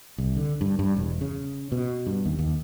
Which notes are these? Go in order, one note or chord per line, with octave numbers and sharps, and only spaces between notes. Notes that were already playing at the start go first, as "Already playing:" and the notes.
C2
D3
G2
G2
E1
C#3
B2
G2
D#2
D#2